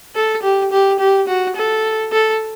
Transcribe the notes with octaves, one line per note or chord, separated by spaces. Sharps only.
A4
G4
G4
G4
F#4
A4
A4